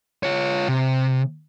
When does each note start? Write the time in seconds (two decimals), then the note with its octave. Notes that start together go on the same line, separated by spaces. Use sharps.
0.23 F4 C#5
0.68 C3